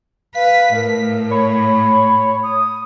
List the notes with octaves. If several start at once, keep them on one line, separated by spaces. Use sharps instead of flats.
B4 F5 B6
A2 A#4
C#5 B5
D#6